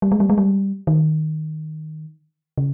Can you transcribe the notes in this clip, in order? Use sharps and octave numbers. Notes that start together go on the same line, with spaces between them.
G3
G#3
G3
G#3
G3
D#3
C#3